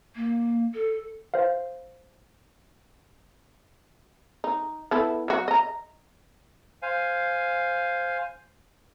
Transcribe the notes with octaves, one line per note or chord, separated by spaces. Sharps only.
A#3
A4
C5 F5
D#4
B3 E4 A4
F#3 F#4
D#5 A#5
C5 F5 G#5